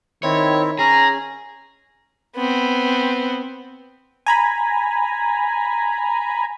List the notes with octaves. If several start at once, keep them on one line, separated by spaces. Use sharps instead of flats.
D#3 C4 E4 C#5
C#4 G#4 A#5
B3 C4
G#5 A#5 B5